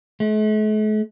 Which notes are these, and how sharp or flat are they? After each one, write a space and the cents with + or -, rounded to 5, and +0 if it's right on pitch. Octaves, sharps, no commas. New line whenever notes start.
A3 -45